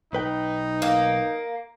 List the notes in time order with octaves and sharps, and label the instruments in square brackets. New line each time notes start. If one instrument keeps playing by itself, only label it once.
[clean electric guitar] B1 B4 G5 [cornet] D#4
[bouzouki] A#3